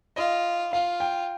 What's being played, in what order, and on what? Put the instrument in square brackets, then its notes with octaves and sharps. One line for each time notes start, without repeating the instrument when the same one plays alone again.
[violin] F4 [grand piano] D#5
[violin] F4 [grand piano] F5
[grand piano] G5